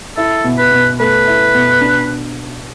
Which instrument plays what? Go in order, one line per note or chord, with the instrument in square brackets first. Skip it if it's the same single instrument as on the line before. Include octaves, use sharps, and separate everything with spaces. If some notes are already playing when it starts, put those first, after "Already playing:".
[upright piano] E4 [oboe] A4
[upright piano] B2
[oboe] B4
[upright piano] B2
[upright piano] A3 [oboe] B4
[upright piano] E4
B2
D4